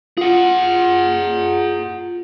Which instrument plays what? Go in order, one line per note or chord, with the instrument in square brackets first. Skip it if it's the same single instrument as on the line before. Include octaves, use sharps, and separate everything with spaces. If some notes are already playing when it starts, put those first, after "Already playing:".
[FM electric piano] F4 [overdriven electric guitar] G#4 F#5